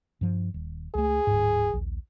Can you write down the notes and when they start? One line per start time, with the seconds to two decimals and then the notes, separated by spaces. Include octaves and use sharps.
0.21 G2 F3
0.54 D#1
0.95 C#2 A3 G#4
1.27 D1 G#2
1.73 A#1 D#2